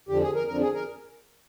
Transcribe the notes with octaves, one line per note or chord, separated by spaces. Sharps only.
F2 D3 F3 G4
G#4
A#4
F2 D3 F3 A#4
G#4
A#4